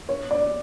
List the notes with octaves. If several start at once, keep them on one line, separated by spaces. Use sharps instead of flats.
C#5
D5